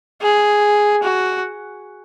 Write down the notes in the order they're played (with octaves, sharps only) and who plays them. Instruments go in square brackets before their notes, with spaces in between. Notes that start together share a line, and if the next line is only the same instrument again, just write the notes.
[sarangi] G#4
F#4